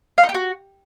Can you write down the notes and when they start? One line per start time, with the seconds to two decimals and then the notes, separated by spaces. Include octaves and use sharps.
0.18 F5
0.23 D#4
0.29 G4
0.34 F#4